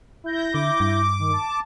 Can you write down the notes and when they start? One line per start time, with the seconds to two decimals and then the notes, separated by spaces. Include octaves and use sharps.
0.24 E4 G6 A#6
0.54 D3 D6
0.80 G2
1.20 D#3
1.33 A5